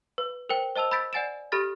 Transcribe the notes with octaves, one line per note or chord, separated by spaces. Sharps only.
B4
A#4 C5 G5
C5 D#5 A5 E6 F7
B5 E6 G6 A6 B6 D7
D5 F#5 G#5 A6 D7 E7
G4 A4 B5 F6 A6 A#6